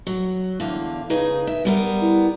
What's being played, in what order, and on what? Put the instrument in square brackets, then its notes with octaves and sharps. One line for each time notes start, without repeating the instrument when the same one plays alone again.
[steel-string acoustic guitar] F#3
E2 D3 F5
[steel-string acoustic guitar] C#3 D#4 G#4 [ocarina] B4
[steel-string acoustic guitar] E5
G3 B3 A#4
[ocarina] E4